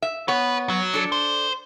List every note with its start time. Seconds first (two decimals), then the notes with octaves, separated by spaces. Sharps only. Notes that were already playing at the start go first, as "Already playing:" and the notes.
0.02 E5
0.28 B3 B4 C#5
0.69 F#3
0.94 D4 A4
1.12 C5